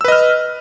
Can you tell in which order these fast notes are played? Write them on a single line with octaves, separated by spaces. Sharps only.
E6 B4 D#5 F6